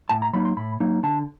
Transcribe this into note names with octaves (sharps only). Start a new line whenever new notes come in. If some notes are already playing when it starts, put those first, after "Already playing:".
A2 A5
A#5
F#3 A#3 D#4 B5
C6
A2 B5
F#3 A#3 D#4
D3 A5